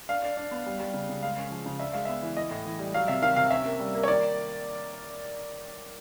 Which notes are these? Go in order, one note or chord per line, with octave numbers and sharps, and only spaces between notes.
D4 F5
D4
D4
B3
G3
G3
C#3
C#3
G#3 F5
C#4
F3
C#3
D4 E5
G#3 F5
B3 E5
E3
E3 D#5
A2
E3
G3
F#3 F5
C3 E5
D#3 F5
C3 F5
C#4 E5
A#3
G3
A#3
C#5
D#3 D5